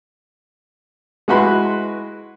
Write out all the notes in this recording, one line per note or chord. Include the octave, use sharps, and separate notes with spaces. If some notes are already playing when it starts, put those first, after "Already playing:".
G#3 E4 F#4 B4 B5 C6